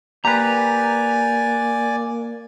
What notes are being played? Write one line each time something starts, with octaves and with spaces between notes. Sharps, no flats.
A#3 G4 B4 D5 G#5 A#5